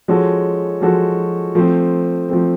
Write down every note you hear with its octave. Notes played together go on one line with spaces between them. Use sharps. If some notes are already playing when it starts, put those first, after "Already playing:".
F3 G#3 C#4 F#4 A4
F3 G#3 C#4 F#4 A4
F3 A3 C4
F3 A3 C4